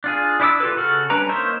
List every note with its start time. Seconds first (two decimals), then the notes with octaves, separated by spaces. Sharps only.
0.04 D4 F4 G#4
0.40 D4 E4 C5 D6 E6
0.60 F4 G4 A4 B4
0.77 C#3 F#4 A4 F6
1.10 G3 C#4 D4 B4 A#5
1.29 A#3 D#4 C5 C#5 E5